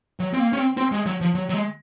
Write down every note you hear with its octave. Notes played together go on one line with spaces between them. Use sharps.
F#3
C4
A#3
C#4
C4
C4
G#3
F#3
F3
F#3
F#3
G#3